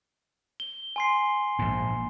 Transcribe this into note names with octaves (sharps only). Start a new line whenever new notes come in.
G7
G#5 C6 C7
A#1 G#2